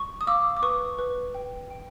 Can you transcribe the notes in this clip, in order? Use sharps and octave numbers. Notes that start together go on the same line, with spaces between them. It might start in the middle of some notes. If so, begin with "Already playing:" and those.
Already playing: C#6
D#6
F5 D6 E6
D6
B4 C#6 D#6
B4
G5
G5